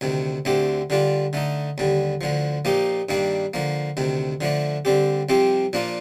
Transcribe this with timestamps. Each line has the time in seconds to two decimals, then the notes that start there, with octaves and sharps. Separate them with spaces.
0.01 D2 C3 D#3
0.45 D2 D3 A3 C4 G4
0.90 D3 G3 D4 F4
1.33 D3 A3 D#4
1.78 D#2 D3 G3
2.21 D2 D3 F3
2.65 A#2 F3 A#3 D#4 G4
3.09 G2 D#3 G3 A#3 D4
3.54 D3 F3 A#3
3.97 D2 C3 D#3
4.41 D3 F3 A3 D4
4.85 D3 G3 C4 G4
5.29 C2 C3 F3 C4 G4
5.73 A#2 F3 A#3 D4 F4